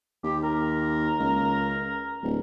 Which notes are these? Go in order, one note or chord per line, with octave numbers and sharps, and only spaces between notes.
D#2 G4
A#4
C#2
D1